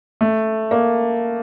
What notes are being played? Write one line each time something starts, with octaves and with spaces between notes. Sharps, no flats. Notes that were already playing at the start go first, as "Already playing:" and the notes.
A3
A#3